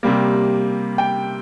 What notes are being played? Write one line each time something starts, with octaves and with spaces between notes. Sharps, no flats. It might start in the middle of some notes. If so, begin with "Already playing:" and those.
C3 G3 A#3
G5